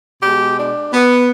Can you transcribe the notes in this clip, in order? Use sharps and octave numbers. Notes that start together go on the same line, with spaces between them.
B2 G#3 G4
D4
B3